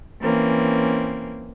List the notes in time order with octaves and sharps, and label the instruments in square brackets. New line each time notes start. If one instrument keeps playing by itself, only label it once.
[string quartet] E3 A#3 C4 C#4